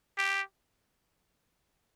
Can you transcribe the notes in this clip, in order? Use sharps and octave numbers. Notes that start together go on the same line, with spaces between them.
G4